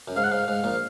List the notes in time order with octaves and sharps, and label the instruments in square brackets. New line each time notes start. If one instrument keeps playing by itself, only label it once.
[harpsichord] F#2
[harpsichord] G#2 [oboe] F5
[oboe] F#5
[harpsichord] G#2 [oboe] F5
[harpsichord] G#2
A#1 A#2